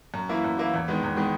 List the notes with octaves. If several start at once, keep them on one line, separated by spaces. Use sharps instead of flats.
F#2
E3 A#3 E4
F#2
E3 A#3 E4
E2
D#3 G#3 B3
E2
D#3 G#3 B3